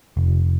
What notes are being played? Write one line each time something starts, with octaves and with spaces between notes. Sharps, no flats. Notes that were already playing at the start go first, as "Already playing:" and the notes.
F1